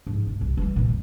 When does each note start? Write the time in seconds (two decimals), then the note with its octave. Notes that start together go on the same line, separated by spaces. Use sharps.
0.07 G#2 F3
0.27 B2
0.41 C2
0.57 E3 G3
0.76 A#2
0.89 F2